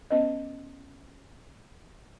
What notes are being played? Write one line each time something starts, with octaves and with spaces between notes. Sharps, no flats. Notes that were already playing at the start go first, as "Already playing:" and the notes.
B3 C#4 B4 D#5